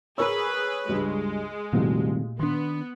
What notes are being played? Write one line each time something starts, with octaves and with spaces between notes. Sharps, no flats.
G#4 A#4 B4 C#5 C#6 E6
C#2 G2 G#3
F1 C2 A#2 D#3 C4 F#4
D#3 B3 D4 C6